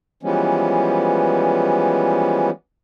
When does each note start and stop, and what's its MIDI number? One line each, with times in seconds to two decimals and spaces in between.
0.23 2.50 52
0.23 2.50 53
0.23 2.50 55
0.23 2.50 56
0.23 2.50 59
0.23 2.50 61